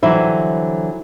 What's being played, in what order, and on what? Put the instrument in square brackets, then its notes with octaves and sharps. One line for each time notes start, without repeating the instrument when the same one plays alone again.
[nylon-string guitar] D3 E3 F#3 G3 E4 C5